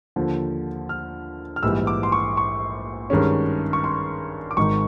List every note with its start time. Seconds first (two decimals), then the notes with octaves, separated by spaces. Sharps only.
0.16 D#2 D3 F3
0.89 F6
1.56 F6
1.63 A#1 G#2 E3 G3 E6
1.87 D6
2.03 C6
2.12 C#6
2.37 C#6
3.10 G2 D#3 G#3 C#4
3.73 C#6
3.84 C6
4.51 D6
4.57 G#1 G#2 D#3 C#6